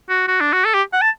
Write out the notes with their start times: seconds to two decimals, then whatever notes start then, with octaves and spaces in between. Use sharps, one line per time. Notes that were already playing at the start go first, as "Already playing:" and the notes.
0.09 F#4
0.28 F#4
0.41 D4
0.53 F#4
0.65 A4
0.74 G4
0.93 F#5
1.02 A5